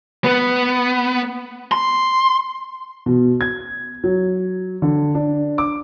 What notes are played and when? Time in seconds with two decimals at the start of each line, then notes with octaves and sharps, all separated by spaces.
0.24 B3
1.72 C6
3.06 B2
3.41 G#6
4.04 F#3
4.82 D3
5.15 D4
5.58 D6